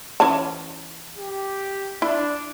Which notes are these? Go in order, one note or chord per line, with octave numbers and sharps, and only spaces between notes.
E3 C#4 A5
G4
D4 E4